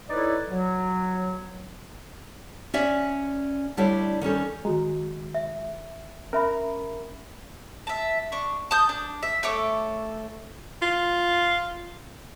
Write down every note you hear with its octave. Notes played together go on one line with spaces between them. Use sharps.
D#4 E4 A4 B4 C#5 D5
F#3
C#4 D5 E5
D2 G3 D4 E4 C#5 D5
D#3 G3 C#4 A4
D#3 G#3 F#4 A#5
E5
C#4 A#4 E5 B5
E5 A5
D4 C#6
A5 D#6 G6
D4
E5
A3 A4 C#5 D6
F4